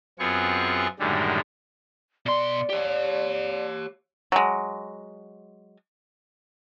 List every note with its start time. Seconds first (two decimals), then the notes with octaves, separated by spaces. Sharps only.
0.19 F#2 B3 C4 F4 G#4 C#6
0.99 F#2 A2 D3 D#3 G3 G#3
2.26 B2 D5 C6
2.70 G4 C#5
4.32 F#3 G#3